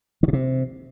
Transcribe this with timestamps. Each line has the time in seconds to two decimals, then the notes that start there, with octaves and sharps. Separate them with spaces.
0.23 D#3
0.28 B2
0.33 C3